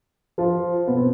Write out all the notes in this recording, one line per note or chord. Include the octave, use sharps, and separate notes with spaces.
F3 F4
B2 B3
C4